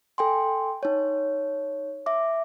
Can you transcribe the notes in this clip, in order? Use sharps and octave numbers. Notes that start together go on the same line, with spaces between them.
A4 G5 G#5 C6
D#4 C#5
E5 D6